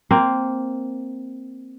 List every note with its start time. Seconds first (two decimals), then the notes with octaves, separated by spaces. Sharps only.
0.11 A#3 C4